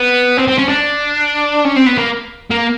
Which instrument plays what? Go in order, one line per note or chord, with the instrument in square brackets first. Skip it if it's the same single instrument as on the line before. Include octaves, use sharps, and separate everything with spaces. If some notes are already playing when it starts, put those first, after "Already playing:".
Already playing: [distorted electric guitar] B3
C4
C4
C#4
D4
C#4
C4
B3
A#3
A#3